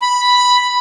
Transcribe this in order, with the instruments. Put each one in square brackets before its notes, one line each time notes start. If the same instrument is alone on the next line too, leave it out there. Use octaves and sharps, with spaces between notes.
[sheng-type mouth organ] B5